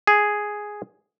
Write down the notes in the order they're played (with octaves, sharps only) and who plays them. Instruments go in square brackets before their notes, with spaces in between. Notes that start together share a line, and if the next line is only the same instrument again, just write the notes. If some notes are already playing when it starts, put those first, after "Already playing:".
[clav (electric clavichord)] G#4